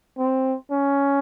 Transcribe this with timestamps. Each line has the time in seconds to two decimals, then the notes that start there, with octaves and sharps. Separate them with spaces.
0.18 C4
0.71 C#4